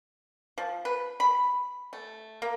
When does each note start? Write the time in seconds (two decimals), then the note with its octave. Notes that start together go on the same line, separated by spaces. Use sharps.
0.58 F3
0.85 B4
1.20 B5
1.93 A3
2.42 A#3